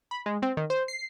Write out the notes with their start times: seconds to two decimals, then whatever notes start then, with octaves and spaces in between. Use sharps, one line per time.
0.11 B5
0.26 G#3
0.42 C4
0.57 D#3
0.70 C5
0.88 C7